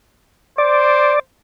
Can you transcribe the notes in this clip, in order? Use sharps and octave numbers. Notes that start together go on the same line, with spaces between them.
C5 D5